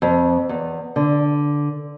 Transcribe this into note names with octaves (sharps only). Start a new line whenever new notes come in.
F2
E2
D3